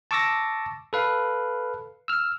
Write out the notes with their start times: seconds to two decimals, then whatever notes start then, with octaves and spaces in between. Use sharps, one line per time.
0.11 A5 C#6 D6 E6 A6 A#6
0.93 A4 B4 F5
2.08 E6 F6